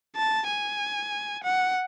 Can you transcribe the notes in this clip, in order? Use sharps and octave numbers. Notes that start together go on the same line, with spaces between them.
A5
G#5
F#5